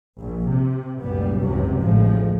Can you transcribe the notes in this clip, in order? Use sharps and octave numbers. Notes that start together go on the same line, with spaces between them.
A#1
C3
F1 C#2 F#2 A#2 G3 B3
F#1 C#2 G#2 C3 E3 F#3
A1 D2 A2 F3 G#3